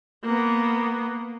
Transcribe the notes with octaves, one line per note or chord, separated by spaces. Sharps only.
A#3 B3